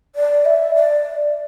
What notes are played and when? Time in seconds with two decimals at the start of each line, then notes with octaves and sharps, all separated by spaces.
0.16 D5
0.45 E5
0.75 D5